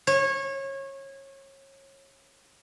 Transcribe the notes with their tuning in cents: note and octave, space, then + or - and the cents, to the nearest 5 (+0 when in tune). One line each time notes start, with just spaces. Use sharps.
C#5 -25